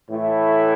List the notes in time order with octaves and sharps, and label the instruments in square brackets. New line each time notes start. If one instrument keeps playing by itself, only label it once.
[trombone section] A2 E3 A3 E4